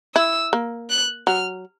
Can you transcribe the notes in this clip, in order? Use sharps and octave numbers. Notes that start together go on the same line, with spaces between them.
E4 E6
A#3
F#6
F#3 F6